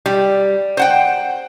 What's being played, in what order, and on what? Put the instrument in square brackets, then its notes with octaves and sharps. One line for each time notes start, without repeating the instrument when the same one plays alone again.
[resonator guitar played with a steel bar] G3
C5 F#5 G5